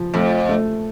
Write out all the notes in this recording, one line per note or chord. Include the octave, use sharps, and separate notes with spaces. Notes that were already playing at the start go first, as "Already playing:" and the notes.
Already playing: F3
F2 A3
A3